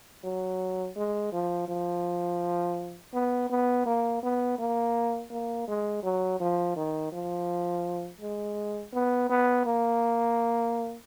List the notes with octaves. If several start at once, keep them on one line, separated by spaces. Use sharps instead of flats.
F#3
G#3
F3
F3
B3
B3
A#3
B3
A#3
A#3
G#3
F#3
F3
D#3
F3
G#3
B3
B3
A#3